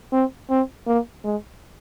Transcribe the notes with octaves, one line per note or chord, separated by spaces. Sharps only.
C4
C4
A#3
G#3